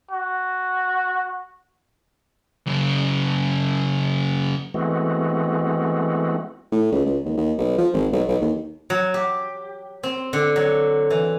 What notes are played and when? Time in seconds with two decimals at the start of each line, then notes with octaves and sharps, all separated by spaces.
0.11 F#4
2.66 F#2 C#3
4.74 E3 G#3 A3 B3 C4 F#4
6.72 A2
6.92 C#2
7.05 C#2
7.25 D#2
7.37 D#2
7.58 B1
7.78 F3
7.93 G#1
8.13 B1
8.28 B1
8.41 D#2
8.90 F#3
9.14 G4
10.03 C4
10.33 D3
10.56 F#3
11.10 E3